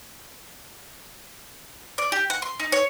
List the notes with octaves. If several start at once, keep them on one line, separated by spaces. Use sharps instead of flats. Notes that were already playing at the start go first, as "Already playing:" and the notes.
D5
G4
F#5
C6
D#4
C#5